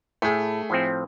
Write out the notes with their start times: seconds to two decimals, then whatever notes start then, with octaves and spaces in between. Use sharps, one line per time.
0.22 A2 A3 G#4
0.70 A2 F3 C4